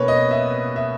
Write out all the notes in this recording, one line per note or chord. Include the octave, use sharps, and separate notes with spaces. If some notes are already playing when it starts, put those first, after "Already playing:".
Already playing: B2 A#3 C#4 B4 C#5
D#5
E5
E5